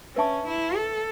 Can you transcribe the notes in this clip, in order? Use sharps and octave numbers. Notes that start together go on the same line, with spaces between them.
C#4 B4 E5 A5 C#6
E4
A4